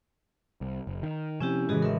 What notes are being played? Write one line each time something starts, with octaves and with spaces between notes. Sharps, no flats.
C2
F#1
D#3
C3 F3 C4 C#4 E4 G4 G#5
A2 C#3 E3 G#3 F#4 G#4 D#5
A1 A#4 E5